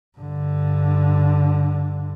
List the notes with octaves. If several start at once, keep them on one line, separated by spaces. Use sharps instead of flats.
G2 D3